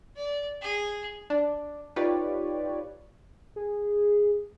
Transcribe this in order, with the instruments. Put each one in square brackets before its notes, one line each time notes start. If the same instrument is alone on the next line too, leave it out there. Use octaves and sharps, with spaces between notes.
[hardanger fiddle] D5
G#4
[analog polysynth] D4
D#4 F4 G4 B4 C#5 D5
[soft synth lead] G#4